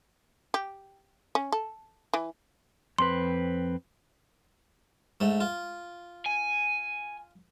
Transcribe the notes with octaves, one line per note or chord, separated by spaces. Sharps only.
G4
C#4
A4
E3
F2 C4 B4 C6
G#2 A3
F4
G#5